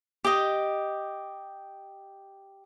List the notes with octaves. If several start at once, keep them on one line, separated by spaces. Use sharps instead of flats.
G4 D#5